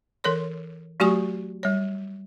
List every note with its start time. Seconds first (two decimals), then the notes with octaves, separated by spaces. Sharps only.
0.24 E3 A4 A#4 C#5 C6
1.00 F#3 A3 F#4 G4 G#5 C#6
1.63 G3 C#5